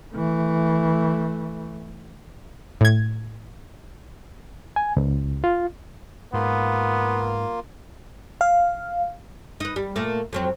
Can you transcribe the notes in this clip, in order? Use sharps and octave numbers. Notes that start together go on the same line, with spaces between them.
E3 A3
A2 G#6
G#5
C#2
F4
G#2 A#3 B3 F4
F5
D#4 B4
G3
A#2 A3 A#3
F2 F#3 C4